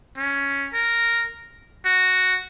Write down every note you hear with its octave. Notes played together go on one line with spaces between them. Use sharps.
C#4
A#4
F#4